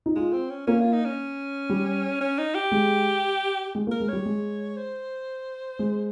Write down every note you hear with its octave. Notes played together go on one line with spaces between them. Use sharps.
D#4
G#3 F4
C4
C#4
A#3 C#4
F4
D#4
C#4
G3
C#4
D#4
G4
G#3
G#3
A#3
A#4
G#3
G3 C#5
G#3
C5
G#3